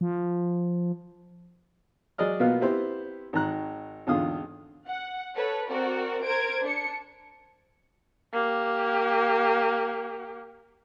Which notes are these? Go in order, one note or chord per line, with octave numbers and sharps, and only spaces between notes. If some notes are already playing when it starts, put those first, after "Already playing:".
F3
F#3 G#4 D5 D#5 F6
B2 A#3 B3 F4 F#4
B3 C4 E4 G4 C5
G#1 D#3 A#5 F#6
G#1 E2 D3 F4 D#6
F#5
A4 B4 C#5
C4 F#4 A#4 D5
A#4 C5 G#6 D7
D4 C#7
A#3 G4